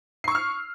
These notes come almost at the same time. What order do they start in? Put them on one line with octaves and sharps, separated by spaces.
C7 C#6 E6 F6